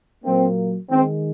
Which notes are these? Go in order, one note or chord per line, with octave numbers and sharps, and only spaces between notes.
A#2 F#3 A#3 C4
D#3 G#3 C4